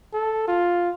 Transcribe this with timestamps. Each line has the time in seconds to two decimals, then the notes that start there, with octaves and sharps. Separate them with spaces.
0.13 A4
0.48 F4